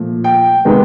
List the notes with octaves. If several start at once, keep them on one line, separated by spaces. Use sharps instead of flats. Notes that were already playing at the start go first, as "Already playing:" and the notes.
Already playing: A#2 F3 A3
G5
C3 D#3 G#3 B3